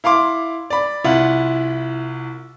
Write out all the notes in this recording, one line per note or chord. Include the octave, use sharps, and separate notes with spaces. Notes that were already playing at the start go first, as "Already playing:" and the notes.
E4 F5 C6 D6
D5 B5
C2 E4 F4 F#5